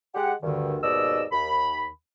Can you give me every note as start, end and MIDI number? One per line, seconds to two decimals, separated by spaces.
0.15 0.33 56
0.15 0.33 67
0.15 0.33 78
0.43 0.77 38
0.43 0.77 43
0.43 0.77 50
0.43 0.77 51
0.83 1.24 39
0.83 1.24 44
0.83 1.24 47
0.83 1.24 74
0.83 1.24 75
0.83 1.24 88
1.32 1.86 39
1.32 1.86 83